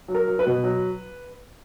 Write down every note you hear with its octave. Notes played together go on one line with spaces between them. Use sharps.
F#3
A#4
F#3
B4
B2
F#3